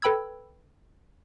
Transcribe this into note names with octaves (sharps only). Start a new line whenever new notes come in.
A4 B4 G5 B5 E6 G#6